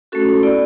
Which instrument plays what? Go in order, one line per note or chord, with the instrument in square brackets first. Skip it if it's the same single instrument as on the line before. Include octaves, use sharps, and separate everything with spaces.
[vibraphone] A3 C#4 F#4 A4
B3 E4 D5